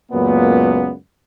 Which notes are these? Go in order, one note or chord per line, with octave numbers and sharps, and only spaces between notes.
C#2 F#2 A#2 A#3 B3